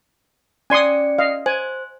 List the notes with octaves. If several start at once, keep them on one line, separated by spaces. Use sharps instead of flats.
C#4 D5 G#5 C6 D#6 C#7
D#5 F5
C5 G#5